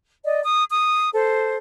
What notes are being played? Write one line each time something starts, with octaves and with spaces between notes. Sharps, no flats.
D5 D#5
D#6
D#6
A4 C5